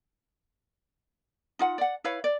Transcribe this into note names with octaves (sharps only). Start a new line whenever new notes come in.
D#4 F4 F#5
D5 F#5
E4 B4 C#5 F5
D5